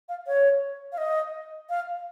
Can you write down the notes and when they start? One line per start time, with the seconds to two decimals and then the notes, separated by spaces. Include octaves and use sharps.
0.09 F5
0.27 C#5
0.92 F5
0.98 D#5
1.69 F5